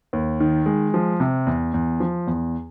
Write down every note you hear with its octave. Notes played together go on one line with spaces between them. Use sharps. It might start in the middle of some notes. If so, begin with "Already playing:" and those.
D#2
D#3
G#3
F3
C3
E2
E2
F3
E2